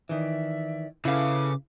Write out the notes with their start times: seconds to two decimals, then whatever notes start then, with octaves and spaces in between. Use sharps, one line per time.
0.09 D#3 E3 D5 E5
1.05 C#3 E4 A4 B4 F5 D6